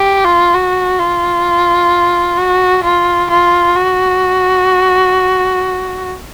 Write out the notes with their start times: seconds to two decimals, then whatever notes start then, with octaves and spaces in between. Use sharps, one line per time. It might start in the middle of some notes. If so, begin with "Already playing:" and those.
Already playing: G4
0.24 F4
0.54 F#4
1.00 F4
2.38 F#4
2.83 F4
3.30 F4
3.76 F#4